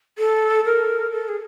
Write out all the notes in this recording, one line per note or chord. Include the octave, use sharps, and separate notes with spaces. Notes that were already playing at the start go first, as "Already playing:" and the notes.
A4
A#4
A4
G#4